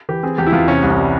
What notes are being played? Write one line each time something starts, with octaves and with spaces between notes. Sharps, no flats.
E3 G4
C4 G#4
E2 G4
E4
E2 F4
C3 C#4
C2
C#4
G3